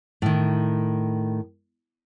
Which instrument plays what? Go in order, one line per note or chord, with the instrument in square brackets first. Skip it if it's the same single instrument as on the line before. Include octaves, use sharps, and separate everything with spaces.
[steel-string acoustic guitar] A2 D#3